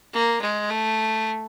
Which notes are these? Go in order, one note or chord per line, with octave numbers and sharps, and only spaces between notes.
A#3
G#3
A3